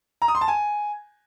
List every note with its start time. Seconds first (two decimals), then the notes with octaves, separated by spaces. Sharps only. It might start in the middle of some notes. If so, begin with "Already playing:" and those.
0.22 A#5
0.28 D#6
0.35 C6
0.41 A5
0.48 G#5